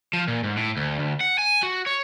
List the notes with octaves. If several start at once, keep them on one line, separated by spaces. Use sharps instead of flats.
F3
A#2
G#2
A2
D2
D2
F#5
G#5
F#4
C#5